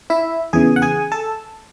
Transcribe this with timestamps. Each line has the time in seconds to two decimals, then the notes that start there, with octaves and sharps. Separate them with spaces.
0.10 E4 E5
0.53 E2 C#3 E3 G#4 G#5
0.76 F#5
0.82 G#4 G#5
1.12 A4 A5